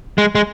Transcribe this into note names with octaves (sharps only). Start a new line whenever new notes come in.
G#3
G#3